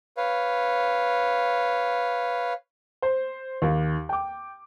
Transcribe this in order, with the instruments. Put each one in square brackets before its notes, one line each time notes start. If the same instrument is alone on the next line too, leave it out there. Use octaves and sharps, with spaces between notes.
[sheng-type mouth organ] B4 C#5 F5
[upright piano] C5
D#2
G5 D6